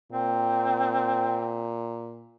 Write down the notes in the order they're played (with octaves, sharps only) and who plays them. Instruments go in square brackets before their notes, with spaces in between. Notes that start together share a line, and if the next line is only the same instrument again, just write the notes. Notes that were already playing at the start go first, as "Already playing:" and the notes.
[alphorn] A#2 [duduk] C4